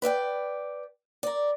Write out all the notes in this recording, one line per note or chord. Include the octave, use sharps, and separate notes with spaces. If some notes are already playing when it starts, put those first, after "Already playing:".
B4 D5 E5 G5
A#4 D5